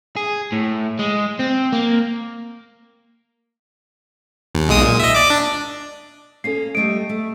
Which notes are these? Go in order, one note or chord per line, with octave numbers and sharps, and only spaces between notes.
G#4
A2
G#3
C4
A#3
D#2
B1 G#3 D#6
A#2
D#5 E5
D5 D6
D4
A#3 C#4 A4 C7
G3 A3 D#5 D7
A3